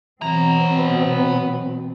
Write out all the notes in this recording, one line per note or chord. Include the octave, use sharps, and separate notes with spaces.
B2 E3 F#3 B3 C4 A#5